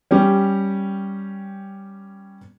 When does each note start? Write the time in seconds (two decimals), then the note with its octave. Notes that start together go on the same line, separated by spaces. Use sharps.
0.11 G3 C#4 G4